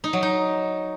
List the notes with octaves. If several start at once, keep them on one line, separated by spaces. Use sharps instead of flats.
D#4
F#3
D#4